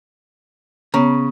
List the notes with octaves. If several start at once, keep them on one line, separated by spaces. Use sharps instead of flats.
C#3 B3 A#5